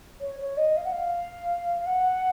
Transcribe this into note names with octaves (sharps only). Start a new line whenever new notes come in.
C#5
C#5
D#5
F5
F#5
F5
F5
F#5